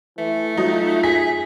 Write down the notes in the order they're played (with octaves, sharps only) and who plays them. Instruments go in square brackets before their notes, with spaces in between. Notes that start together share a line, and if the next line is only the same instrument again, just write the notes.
[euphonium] E3 [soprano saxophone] A3
[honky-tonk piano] F#3 D#4 [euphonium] F4
[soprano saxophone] G#4 [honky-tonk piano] B6